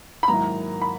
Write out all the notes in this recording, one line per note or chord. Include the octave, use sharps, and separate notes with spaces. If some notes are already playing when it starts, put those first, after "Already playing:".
B5
G#2 D#3 F#3 A#3 E4 A#5
B5